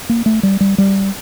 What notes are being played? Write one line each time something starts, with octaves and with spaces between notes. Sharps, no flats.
A#3
A3
G3
G3
G3